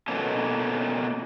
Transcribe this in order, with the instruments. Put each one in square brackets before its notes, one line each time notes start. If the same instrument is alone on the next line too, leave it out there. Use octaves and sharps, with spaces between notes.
[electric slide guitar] B2 A#3 B3 C#4 A4